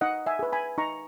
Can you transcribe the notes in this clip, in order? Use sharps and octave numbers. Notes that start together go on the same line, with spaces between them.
D#4 D#5 F#5
E5 G#5
G#4 B4
G#5 B5
D#4 A#5 C#6